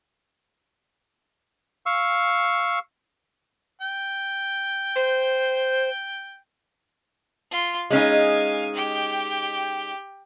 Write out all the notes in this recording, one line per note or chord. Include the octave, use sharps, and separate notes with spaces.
F5 C#6 E6
G5
C5
F4 C6
G#3 C#4 D#4 F5 G#5
G4 G5